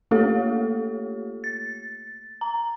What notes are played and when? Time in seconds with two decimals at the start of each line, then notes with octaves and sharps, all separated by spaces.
0.11 A3 A#3 F4 G4 A4 C#5
1.44 A6
2.41 A#5